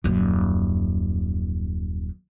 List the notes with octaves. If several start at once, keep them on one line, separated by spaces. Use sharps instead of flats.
D#1 F#2